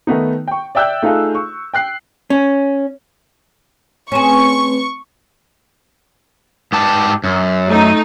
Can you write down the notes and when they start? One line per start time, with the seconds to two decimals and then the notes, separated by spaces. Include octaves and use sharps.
0.07 D#3 A3 B3 D#4
0.48 G5 C#6
0.75 D5 E5 G5 E6 F#6 G6
1.02 A3 D#4 F4 G#4 A4
1.35 C#6
1.74 G5 F#6 C7
2.30 C#4
4.12 A3 C4 C#4 G#4 B4 C#6
6.72 G#2 G4 A5
7.24 F#2
7.69 A3 D#4